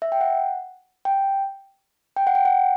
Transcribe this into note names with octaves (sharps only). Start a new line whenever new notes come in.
E5
G5
F#5
G5
G5
F#5
G5
F#5